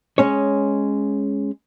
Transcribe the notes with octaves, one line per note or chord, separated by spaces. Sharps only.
G#3 C#4 C#5